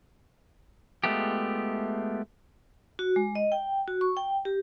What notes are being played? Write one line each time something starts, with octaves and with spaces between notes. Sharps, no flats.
G#3 A3 B3 F4 G4
F#4
G#3
D#5
G5
F#4
C#6
G5
G4